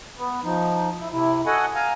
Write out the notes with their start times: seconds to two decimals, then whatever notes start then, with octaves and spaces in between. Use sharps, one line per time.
0.18 B3
0.44 F3 D#4
0.99 E4
1.12 C3 E4
1.46 F#4 A4 D#5 F#5 G#5
1.75 F5 G#5 A#5